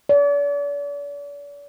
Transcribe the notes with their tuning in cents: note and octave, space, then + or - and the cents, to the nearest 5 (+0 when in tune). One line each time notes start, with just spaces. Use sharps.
D5 -40